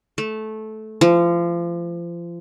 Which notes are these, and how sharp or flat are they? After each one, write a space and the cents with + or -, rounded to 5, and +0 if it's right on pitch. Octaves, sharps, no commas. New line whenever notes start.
A3 -15
F3 -30